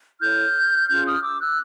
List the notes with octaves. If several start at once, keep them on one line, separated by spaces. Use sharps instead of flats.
E4 A4 C#5 F6 G6
C#4 F4 G#4 F6 G6
D#6 F6
D6 E6
E6 F#6